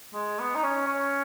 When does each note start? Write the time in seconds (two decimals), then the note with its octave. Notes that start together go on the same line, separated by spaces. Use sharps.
0.14 G#3
0.39 B3
0.55 D#4
0.63 C#4
0.87 C#4